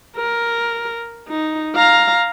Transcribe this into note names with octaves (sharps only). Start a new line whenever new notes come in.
A#4
D#4
F5 A#5